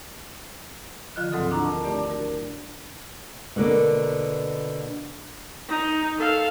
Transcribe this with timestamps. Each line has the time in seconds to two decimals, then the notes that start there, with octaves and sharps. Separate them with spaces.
1.16 D3 D#3 F3 F4 D#5 F#6
1.32 D2 G#2 F#3 C4 A4 D#6
1.51 D4 E4 A#5 C#6
1.64 A#4 D#5 A5
1.84 A3 D4 G4 D5
2.10 F#4 A#4
3.56 B2 D3 A#3 B3
5.68 D#4
6.18 A4 F5